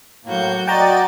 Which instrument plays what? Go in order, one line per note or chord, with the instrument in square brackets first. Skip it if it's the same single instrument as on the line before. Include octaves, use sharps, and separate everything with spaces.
[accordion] A2 A#3 [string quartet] F#3 F#4 G6
[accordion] F#4 D5 [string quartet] D#5 A6 [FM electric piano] G5 A#5